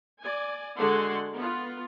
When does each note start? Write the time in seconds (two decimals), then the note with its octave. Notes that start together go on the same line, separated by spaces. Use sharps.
0.20 D5 G#5
0.76 D3 G#3 F#4 A4 F#5 C6
1.36 B3 F4